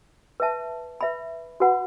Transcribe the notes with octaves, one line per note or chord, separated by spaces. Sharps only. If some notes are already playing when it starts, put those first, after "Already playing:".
B4 E5 A5
B4 E5 B5
F#4 B4 F#5 B5